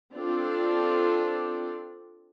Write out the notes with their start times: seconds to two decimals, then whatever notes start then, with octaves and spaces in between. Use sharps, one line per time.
0.15 C4 D4 F4 A4 D5